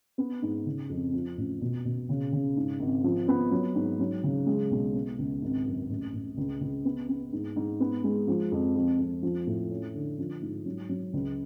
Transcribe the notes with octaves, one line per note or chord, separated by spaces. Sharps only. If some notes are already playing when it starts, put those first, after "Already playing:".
B3
G#2
C#3
F2
F3
A1
B2
B2
C#3
C#3
G#2
G#1
F3
B3
F#3
G#2
F#3
C#3
G#3
B1
B3
C#2
G#1
F#2
A1
A1
C#2
C#2
B3
B3
G#2
G#2
B3
G#3
F3
F2
F2
F2
F3
A2
C#4
D3
F3
G#2
F#3
F#3
C#2